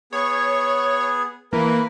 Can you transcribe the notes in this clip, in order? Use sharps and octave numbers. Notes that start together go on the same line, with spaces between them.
B3 G#4 C#5
E3 A#3 A#4 B4